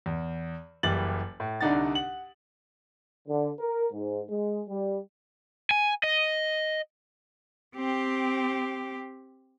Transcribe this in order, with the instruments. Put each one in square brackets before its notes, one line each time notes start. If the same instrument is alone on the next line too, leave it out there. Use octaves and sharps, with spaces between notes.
[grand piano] E2
F#1 E3 G3 A6 F#7
A2
C2 D3 D4 D#4 F#5 A6
F#5 F#7
[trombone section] D3
A#4
G#2
G#3
G3
[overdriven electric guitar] G#5
D#5
[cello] C4 G4